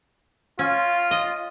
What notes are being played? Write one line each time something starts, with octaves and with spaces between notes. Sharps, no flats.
C#4 F4
D#5